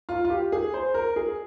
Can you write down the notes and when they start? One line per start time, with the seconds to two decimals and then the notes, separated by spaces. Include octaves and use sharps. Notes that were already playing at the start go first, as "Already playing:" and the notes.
0.09 F4
0.24 F4
0.30 G4
0.52 G#4
0.74 C5
0.94 A#4
1.16 G#4